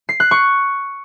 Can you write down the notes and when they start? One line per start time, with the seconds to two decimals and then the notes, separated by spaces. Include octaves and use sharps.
0.09 C7
0.20 F#6
0.31 C#6